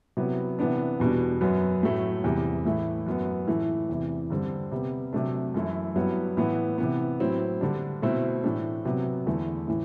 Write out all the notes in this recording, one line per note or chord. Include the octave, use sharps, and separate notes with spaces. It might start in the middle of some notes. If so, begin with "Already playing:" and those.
C3 F#3 B3 E4
C3 E3 B3 D4
E2 B2 G3 D4
F#2 F#3 B3
A2 F#3 A3
E2 C3 G3
A2 E3 A3 E4
F#2 F#3 B3
A2 E3 A3
E2 C3 E3
G2 D3 G3 C4
C3 G3 B3
C3 F#3 A3 D4
F#2 E3 A3 E4
G2 F#3 B3 E4
A2 E3 B3 E4
C3 E3 B3
A2 F#3 C4 E4
D3 G3 D4
B2 A3 C4 E4
A2 E3 A3 D4
C3 F#3 B3
E2 D3 A3 E4
A2 E3